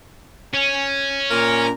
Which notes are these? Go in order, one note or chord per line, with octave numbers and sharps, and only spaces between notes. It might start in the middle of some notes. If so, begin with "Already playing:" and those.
C#4
A#2 A#4